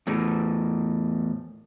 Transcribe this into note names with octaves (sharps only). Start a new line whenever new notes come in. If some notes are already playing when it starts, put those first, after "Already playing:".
E2 A2